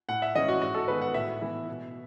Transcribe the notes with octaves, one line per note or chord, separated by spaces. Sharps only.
A2 F#5
E5
E3 G#3 C#4 D#5
F#4
G#2 F#4
A4
D#3 G#3 B3 B4
F#5
A2 E5
E3 B3 E4
B2